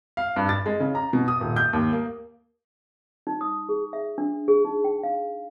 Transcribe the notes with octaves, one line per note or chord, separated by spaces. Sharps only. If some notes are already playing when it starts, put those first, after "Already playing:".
F5
G2
A6
G#3
C#3
A#5
B2
D#6
D#1
G6
D#2
A#3
D#4
D#6
G#4
E5
D4
G#4
D#4
G5
F5